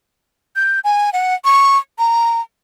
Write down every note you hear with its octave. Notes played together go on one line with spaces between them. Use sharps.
G6
G#5
F#5
C#6
A#5